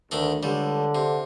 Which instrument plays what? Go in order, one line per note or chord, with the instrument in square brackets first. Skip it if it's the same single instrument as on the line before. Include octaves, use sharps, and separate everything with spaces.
[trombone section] D2 [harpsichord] D#3 D4 A4
[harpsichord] C#2 G3 [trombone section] D3
[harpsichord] C3